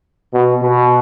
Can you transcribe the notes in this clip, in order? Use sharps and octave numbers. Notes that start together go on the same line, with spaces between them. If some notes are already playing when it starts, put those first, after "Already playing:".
B2
B2